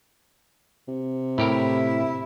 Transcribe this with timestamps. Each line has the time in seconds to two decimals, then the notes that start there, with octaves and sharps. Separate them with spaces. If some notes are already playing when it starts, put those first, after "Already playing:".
0.88 C3
1.38 A2 E4 G4 A#4